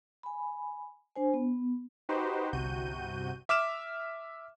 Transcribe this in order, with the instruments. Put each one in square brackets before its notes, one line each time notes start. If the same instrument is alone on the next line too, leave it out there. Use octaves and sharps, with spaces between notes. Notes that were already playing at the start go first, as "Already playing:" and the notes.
[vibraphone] G#5 B5
D4 C5 G#5
B3
[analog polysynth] D#4 F#4 G4 B4 C5
G1 C2 C3 F#4 G6 D#7
[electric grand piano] E5 D6 F6 E7